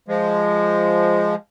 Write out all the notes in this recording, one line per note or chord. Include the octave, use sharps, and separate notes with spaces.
F3 G#3